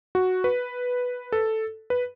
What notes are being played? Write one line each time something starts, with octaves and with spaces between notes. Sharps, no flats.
F#4
B4
A4
B4